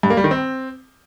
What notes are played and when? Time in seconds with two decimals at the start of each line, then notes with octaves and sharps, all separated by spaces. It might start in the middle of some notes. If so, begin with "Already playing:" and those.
0.03 G2
0.10 A#3
0.17 G3
0.24 D#3
0.31 C4